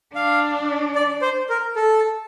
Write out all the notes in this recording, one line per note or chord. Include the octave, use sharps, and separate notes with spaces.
D4 F5
D5
C5
A#4
A4